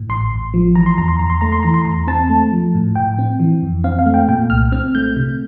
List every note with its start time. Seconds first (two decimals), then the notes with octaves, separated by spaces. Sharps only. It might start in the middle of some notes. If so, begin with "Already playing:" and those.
Already playing: A2
0.09 A1 C6
0.32 A1
0.54 F3
0.75 E3 A#5
0.86 C6
0.98 E2 A#5
1.08 C6
1.19 E2 A#5
1.30 C6
1.41 A3 A#5
1.52 C6
1.63 E3 A#5
1.74 C6
1.85 E2 A#5
2.07 C4 A5
2.29 A3
2.52 F3
2.74 A2
2.95 A2 G5
3.19 C4
3.40 E3
3.63 F2
3.84 C4 F5
3.99 F5
4.06 A3
4.14 G5
4.28 A#2 G5
4.50 C2 F6
4.72 C4 F6
4.95 A3 G6
5.17 C3